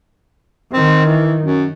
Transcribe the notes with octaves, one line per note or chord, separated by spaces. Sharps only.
D#3 C4
E3
F#2